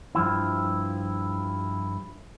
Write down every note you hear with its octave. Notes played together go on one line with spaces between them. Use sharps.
G2 F3 E4